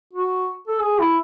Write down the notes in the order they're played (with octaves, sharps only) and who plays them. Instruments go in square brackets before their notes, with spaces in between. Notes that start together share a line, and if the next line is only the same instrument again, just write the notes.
[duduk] F#4
A4
G#4
E4